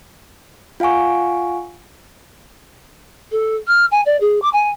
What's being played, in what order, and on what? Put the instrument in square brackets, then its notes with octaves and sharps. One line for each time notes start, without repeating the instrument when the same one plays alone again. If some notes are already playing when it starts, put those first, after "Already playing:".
[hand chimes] F4 F5 F#5 G#5 C#6
[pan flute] A4
F6
G#5
D5
G#4
D6
G#5